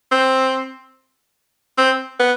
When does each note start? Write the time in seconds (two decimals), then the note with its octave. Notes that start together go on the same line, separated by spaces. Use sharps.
0.11 C4
1.78 C4
2.20 B3